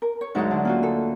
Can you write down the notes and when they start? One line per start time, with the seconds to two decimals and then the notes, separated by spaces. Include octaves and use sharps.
0.02 A#4
0.21 C#5
0.35 D2 G#2 F#3 D#4 F#5
0.51 D3
0.65 A#3 C#4 F4 F#4
0.83 A4